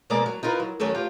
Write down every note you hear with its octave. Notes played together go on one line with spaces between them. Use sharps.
F2 B2 G#3 A#3 A#4 D5
F#3
D#4 F4 A#4 B4
F#3
D#2 F#3 A3 C#4 C#5
F4 G4 B4